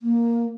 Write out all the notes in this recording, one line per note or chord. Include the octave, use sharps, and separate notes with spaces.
A#3